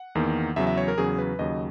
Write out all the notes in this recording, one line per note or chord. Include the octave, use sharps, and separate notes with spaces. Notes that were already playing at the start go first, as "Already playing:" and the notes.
Already playing: F#5
E2 D#3 A#3
E2 C#3 F#3 E5
E5
C#5
A#4
E2 C#3 F#3 G#4
B4
D#2 C#3 F#3 D#5